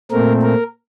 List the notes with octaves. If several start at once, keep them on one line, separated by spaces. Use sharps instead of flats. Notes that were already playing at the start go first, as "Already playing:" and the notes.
A#2 A3 C4 A#4
A#4